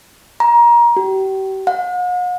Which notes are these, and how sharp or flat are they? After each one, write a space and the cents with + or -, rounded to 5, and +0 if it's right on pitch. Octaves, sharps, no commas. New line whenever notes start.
A#5 +25
G4 -35
F#5 -45